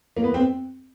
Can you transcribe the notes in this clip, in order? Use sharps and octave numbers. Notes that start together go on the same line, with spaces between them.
A#3
B3
C4